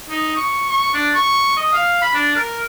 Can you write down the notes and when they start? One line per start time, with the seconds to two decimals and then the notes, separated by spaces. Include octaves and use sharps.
0.09 D#4
0.36 C#6
0.70 C#6
0.94 D4
1.15 C#6
1.57 D#5
1.73 F5
2.02 B5
2.14 D4
2.36 A#4